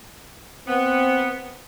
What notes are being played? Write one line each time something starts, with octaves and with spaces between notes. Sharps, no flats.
B3 C4